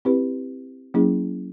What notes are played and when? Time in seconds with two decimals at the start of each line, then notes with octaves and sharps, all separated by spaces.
0.05 C4 E4 G4 B4
0.94 F#3 A#3 C#4 E4 G#4